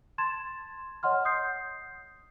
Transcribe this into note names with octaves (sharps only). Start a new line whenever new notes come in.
A5 C6 G#6 A6 E7
C#5 D#5 F#5 C6 F6
D#6 G6 C7